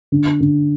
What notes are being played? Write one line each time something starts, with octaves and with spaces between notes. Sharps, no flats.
D3
D3